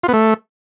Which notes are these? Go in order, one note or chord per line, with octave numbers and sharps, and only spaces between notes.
F4
B3
A3